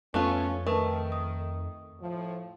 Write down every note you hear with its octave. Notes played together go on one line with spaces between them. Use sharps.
F2 A3 B3 C#4 F4 A5
D#3 A3 A#4 B4 A5
D#6
A2 F3